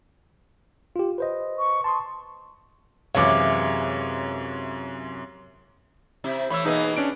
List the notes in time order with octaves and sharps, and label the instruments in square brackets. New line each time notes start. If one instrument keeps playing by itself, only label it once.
[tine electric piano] F4 G4
B4 C5 D#5
[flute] C#6
[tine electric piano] A5 C#6 D#6 [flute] C6
[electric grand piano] F#2 G#3 C#5 [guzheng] C3 E3 [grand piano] F5 D6
[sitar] C3 E4 G4
[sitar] A2 E3 C#5 [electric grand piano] B5 E6
[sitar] B2 E3 A#3 [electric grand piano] D#4 G#4 B4
[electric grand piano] C#4 D4 D7